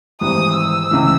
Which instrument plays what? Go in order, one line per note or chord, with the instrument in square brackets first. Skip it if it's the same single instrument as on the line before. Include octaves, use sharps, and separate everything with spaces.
[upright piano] G#1 G#2 E3 G3 [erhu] D#6
[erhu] E6
[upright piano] C#2 C#3 E3